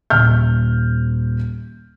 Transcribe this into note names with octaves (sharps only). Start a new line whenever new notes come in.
D#1 F6 G6